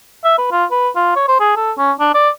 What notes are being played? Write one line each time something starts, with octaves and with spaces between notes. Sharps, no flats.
E5
B4
F4
B4
F4
C#5
C5
G#4
A4
C#4
D4
D5